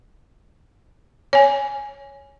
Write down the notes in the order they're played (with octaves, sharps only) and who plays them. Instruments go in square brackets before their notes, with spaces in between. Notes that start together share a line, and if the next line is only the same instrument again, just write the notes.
[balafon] C#5 G#5